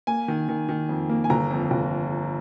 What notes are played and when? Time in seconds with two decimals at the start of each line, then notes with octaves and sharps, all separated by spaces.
0.07 A#3 G#5
0.28 D#3
0.48 D#3
0.69 D#3
0.89 F2
1.09 A#3
1.24 G#5
1.30 G1 A#5
1.51 F2
1.71 G1